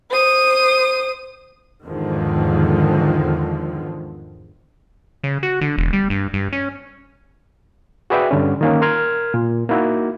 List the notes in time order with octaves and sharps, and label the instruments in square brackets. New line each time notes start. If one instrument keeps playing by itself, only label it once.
[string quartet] C5 D#6
[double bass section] E2 G#2 D3 D#3 F3 G#3
[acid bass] C#3
F#4
D3
E1
G3
G2
G2
C#4
[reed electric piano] F#4 G#4 B4 D5 E5 G5
G2 D3 C#4
D#3 A#3 C#4
A#4 C6 F6 G#6
A#2
A#3 D#4 E4 F#4